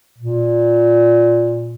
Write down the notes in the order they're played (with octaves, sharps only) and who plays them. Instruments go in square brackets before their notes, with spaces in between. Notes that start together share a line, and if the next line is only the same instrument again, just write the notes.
[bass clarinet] A#2